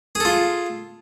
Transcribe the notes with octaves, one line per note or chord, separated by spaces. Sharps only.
F4 G#4 A4